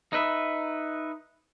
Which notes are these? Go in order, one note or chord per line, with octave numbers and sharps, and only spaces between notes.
D#4 B4 E5